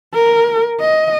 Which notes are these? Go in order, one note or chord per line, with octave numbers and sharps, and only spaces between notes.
A#4
D#5